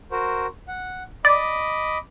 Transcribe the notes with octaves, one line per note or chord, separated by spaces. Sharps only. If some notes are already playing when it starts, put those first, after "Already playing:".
F#4 A#4 C5
F#5
D5 D#5 B5 D6